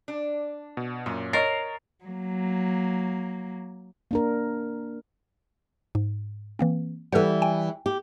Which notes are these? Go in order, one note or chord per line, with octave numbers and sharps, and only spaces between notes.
D4
B2
F#2 A#2 C#4
A#4 C#5 D#5 A6 C7
F#3 A#3
A#3 D4 A#4
G#2
E3 A#3 C4
E3 G3 A4 B4 F#5
G5 G#5
G4